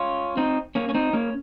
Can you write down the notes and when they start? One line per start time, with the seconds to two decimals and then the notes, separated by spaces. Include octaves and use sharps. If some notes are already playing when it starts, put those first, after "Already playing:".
Already playing: C#4 F4
0.37 C4 D#4
0.75 A#3 C#4
0.89 C#4
0.94 C4 D#4
1.13 A#3 C#4